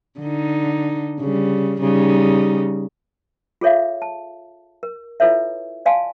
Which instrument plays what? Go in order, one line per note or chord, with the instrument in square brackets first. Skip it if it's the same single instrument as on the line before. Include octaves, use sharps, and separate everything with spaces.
[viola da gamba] D3 D#4
C#3 G3
C#3 G3 D#4
[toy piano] F4 G#4 A4 C#5 E5 F5
A5
A#4
E4 F4 A4 B4 C#5 E5
D5 F5 G#5 A5 C6